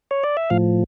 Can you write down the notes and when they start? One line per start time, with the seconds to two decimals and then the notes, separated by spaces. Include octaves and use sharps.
0.11 C#5
0.24 D5
0.37 E5
0.50 A2 F3 F5